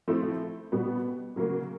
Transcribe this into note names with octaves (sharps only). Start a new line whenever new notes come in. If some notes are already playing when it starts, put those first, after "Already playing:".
F3 A3 C4 E4
B2 G3 B3
C#3 F#3 A#3